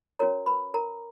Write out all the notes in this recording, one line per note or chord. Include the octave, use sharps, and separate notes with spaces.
C#4 F#4 A#4 C#5 A#5
B4 B5
A#4 A#5